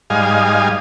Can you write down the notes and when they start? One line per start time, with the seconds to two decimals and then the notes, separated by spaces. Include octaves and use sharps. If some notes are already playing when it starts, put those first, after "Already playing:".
0.10 G#2 G3 D#5 F5 G#5